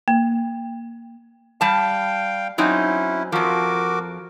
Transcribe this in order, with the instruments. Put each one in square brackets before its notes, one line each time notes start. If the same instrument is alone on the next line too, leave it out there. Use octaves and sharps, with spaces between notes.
[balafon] A#3
[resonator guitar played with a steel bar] G3 A5 [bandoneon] F5 G5
[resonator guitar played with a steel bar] F#3 C4 D#4 [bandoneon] C#4 E4
[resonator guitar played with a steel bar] F2 F3 [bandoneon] F#4 A#4 D6